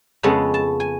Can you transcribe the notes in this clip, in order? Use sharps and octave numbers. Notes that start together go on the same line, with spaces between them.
F2 C#3 G#3 B3 A4
A5
G#5